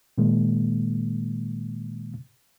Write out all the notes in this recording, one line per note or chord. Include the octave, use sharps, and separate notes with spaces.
A#2 D#3 G#3 A#3